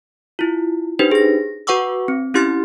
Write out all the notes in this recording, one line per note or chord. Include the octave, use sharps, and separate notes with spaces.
E4 F4
D4 D#4 G4 B4 C5
G#4 A#6
F#4 B4 F#5 C#6 D6 E6
C4
C#4 E4 G4 C6 F6 A6